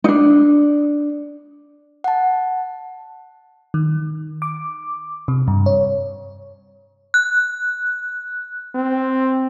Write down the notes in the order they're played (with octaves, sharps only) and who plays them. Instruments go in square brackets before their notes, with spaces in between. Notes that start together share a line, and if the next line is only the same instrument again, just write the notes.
[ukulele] D4 D#4
[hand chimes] F#5 A5
[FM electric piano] D#3
D6
C3
G2
C#5
[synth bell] F#6
[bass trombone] C4